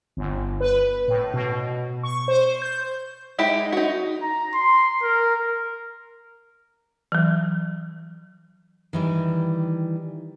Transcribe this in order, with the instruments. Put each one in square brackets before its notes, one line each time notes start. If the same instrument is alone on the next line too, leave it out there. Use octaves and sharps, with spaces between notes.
[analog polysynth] G1
B4
A2
B2
C#6
C5
G6
[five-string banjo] G#3 D#4 E4 G4
D#4 F#4
[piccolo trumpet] A#5
C6
A#4
[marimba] E3 F#3
[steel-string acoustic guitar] D#3 E3 G3